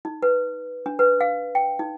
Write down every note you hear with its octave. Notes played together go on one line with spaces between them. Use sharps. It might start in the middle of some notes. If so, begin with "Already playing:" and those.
D#4
B4
D4
B4
F5
G5
D#4